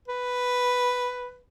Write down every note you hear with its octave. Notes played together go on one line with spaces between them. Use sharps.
B4